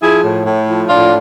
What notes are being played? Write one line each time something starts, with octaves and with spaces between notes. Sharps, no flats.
F3 E4 G#4
A2
A2
F3
A2 D4 F4